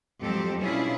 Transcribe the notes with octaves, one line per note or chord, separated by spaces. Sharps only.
F2 F#3 G#3 C4 G4 A4
B2 C#4 D4 E4 F4 G#4